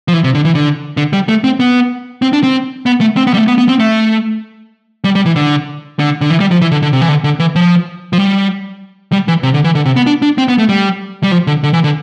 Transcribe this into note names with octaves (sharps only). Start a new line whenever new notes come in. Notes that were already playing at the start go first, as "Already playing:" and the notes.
F3
E3
C3
D3
E3
D3
D3
G3
A3
C4
B3
C4
D4
C4
B3
A3
C4
B3
G3
A3
B3
B3
C4
A3
G3
G3
E3
D3
D3
D3
E3
G3
F3
E3
D3
D3
C3
E3
D3
D3
E3
F3
F3
G3
G3
E3
C3
D3
E3
D3
C3
B3
D4
D4
C4
B3
A3
G3
G3
F3
D3
D3
E3
D3